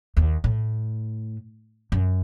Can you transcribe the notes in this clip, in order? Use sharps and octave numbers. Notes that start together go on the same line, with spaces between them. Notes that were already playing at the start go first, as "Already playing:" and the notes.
D#2
A2
F#2